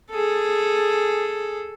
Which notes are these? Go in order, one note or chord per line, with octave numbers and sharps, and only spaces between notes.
G#4 A4